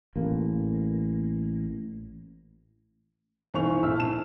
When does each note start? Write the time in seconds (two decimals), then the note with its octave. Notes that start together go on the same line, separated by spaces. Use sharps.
0.16 A1 A#3
3.54 B1 E3 C5 C#6 F7
3.83 A#1 E4 E6 F6
3.96 A5 E7